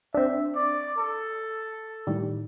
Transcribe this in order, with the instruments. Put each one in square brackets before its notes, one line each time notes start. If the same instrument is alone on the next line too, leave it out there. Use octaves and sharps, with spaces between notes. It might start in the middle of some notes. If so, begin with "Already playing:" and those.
[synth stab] C4 D4 [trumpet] E5
[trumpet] D5
A4
[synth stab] A2 D#3 G3